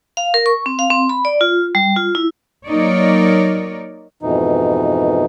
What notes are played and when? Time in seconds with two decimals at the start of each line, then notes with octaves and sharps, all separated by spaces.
0.17 F5
0.34 A#4
0.46 C#6
0.66 C4
0.79 F5
0.90 C4
1.09 B5
1.25 D5
1.41 F4
1.75 G3
1.96 F4
2.15 E4
2.67 F#3 A#3 D#4 A#4 C#5 D5
4.23 F2 G#2 B2 E3 D#4